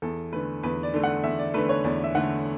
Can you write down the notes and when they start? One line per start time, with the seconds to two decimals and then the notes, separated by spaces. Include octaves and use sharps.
0.02 E2 A4
0.32 D3 A3 B4
0.63 E2 B4
0.83 D5
0.94 D3 A3
1.03 F#5
1.24 E2 E5
1.39 D5
1.54 D3 A3 B4
1.69 C#5
1.84 E2 D5
2.04 E5
2.14 D3 A3 F#5